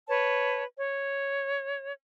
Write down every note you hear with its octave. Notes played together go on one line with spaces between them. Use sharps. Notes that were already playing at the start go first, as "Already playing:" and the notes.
B4 C#5 A5
C#5